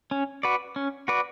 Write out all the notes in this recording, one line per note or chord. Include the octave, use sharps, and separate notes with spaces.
C#4
F#4 B4 D5
C#4
F#4 B4 D5